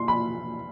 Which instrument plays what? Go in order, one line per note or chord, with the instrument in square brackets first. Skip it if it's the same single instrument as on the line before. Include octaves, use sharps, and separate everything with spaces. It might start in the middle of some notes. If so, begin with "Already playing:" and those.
Already playing: [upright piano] C6
B5